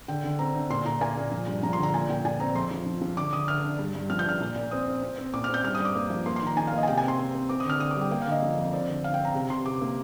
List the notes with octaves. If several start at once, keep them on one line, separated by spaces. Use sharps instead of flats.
D3 G5
D3
C4 A#5
D3
A#2 C6
A#2 A#5
A#3 G#5
A#2
F3
G2
F3 A#5
D3 C6
A#5
A#2 G#5
A#2 G5
A#2 G#5
C4 A#5
F2 C6
F3
F3
F3
D3 D6
D3 D#6
D3 F6
D4
G2
G2
F3 F6
G6
D4 F6
A#2
A#2
C4 D#6
C4
C4
C4
A#2 D6
F6
C4 G6
G2 F6
D#6
G2
D6
A#3
F3
A#3 C6
C6
D#3
A#5
D#3 G#5
F5
A#3
D#5
G#5
C3 G5
G#5
C4
C6
C4
C4
C4 D6
D#6
D3 F6
D3 D#6
G3 D6
G5
A#3 G5
D3 F5
D#5
F3
F2
C4 D5
D3
D3 F5
G5
C4
A#5
C3
C3 C6
C3 D6
A#3